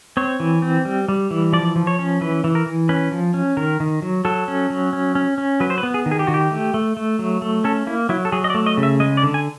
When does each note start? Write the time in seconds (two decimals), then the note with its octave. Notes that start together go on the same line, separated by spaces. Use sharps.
0.17 C4 C#5
0.40 E3
0.62 C4
0.85 G3
1.09 G3
1.31 E3
1.53 F3 D5
1.76 F3
1.87 C#5
1.99 C#4
2.21 E3 B4
2.44 E3
2.55 A#4
2.66 E3
2.89 C#4 B4
3.12 F3
3.34 C#4
3.57 D#3 A#4
3.80 D#3
4.02 F#3
4.25 F#3 A4
4.48 C#4
4.70 F#3
4.93 C#4
5.15 C#4
5.38 C#4
5.60 F#3 B4
5.70 C5
5.78 B4
5.83 B3
5.94 G#4
6.06 D#3
6.11 G#4
6.19 G4
6.27 D#3 F#4
6.34 G4
6.51 A3
6.74 A3
6.97 A3
7.19 F#3
7.42 A3
7.64 C#4 A4
7.87 A#3 E4
8.09 F#3 E4
8.25 A4
8.32 F#3 G#4
8.44 D#5
8.50 D5
8.54 A3
8.66 D#5
8.77 C#3
8.83 E5
9.00 G#3 D#5
9.17 D5
9.23 D3
9.34 G#5